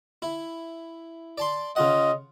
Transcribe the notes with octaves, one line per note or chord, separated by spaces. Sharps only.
E4
D5 A5 C6
C#3 F4 D#5 F#5